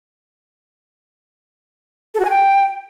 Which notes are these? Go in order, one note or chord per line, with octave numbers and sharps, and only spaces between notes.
A4
F#4
G#5
G5